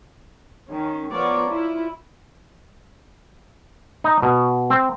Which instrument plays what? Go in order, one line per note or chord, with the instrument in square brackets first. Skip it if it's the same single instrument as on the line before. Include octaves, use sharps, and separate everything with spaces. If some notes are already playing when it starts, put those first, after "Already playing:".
[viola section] D#3 C#4
F3 B3 F4 A#4 C#5 D5
E4 F4
[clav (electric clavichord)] D#4
B2
C4